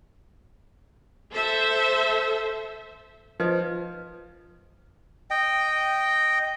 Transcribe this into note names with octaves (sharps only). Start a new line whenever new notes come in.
A4 C5 E5
F3 D#4 B4 D#5
D#5 G5